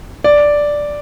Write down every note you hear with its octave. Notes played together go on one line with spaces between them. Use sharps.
D5